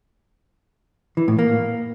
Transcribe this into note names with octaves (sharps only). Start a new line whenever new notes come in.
E3
A2
A#3